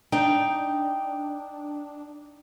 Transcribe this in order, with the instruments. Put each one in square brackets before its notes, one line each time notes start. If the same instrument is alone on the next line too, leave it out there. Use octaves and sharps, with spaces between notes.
[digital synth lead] D4 [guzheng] D#4 [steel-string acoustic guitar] G5